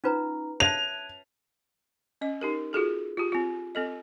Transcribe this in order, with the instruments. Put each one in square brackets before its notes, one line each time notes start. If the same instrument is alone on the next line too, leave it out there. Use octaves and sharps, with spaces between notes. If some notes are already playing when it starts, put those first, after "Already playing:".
[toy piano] C#4 F4 B4 [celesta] D#4 A#5
[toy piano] C#5 E5 A5 [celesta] F#6 G#6 D#7 [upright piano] F7
[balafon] C#4 D#5
D#4 G4 A#4
F4 F#4 G#4 A4
F4 G4
C4 F4
C4 A4 D#5